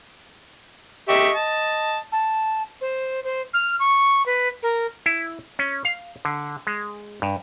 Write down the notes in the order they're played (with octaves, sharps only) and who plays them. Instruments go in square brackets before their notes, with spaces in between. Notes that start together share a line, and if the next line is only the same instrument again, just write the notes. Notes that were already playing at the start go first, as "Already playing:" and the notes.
[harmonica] G4 E5 C#6 [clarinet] D#5
[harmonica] A5
[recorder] A5
C5
C5
F6
C#6
B4
A#4
[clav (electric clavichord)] E4
C#4
F5
D3
G#3
G2